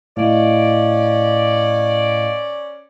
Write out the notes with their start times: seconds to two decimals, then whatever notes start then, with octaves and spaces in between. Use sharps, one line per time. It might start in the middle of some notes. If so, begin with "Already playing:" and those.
0.17 A2 C#4 D5 D#5 F5